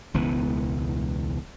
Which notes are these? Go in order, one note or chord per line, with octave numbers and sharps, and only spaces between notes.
E1 C#2 E3 B3